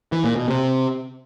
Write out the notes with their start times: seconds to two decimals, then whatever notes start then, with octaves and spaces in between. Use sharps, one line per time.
0.12 E3
0.24 A#2
0.36 B2
0.48 C3